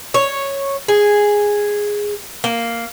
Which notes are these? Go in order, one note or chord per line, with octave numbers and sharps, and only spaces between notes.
C#5
G#4
A#3